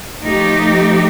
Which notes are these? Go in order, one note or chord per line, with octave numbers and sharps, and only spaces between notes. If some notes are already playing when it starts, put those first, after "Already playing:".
F3 A3 D#4 G4